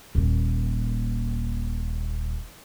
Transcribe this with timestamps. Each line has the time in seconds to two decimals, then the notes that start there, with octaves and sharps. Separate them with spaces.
0.15 D#1 A#2